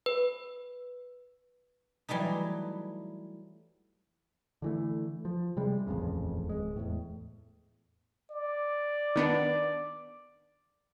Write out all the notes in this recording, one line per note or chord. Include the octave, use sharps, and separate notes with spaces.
B4
E3 F#3 G3 A3 D#4
D3 E3 A3
F3
C3 G3 G#3
D#1 A1 F2 C#3
D1 G#3
E2 A2
D5
D#3 B3 D4